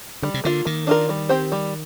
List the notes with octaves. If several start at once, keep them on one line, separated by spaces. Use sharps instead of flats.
D3 G3
C3
D3 A#3 F4
D#3 A#3
D4 F4 A#4
G3
C4 G4 C5
G3